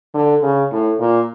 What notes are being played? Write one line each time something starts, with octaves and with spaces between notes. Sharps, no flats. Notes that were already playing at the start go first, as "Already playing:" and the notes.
D3
C#3
A2
A#2